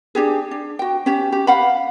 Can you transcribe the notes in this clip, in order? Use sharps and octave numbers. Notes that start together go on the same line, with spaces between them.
D4 G4 G#4
D4
F#4 G5
C#4 G4
G4
F5 F#5 B5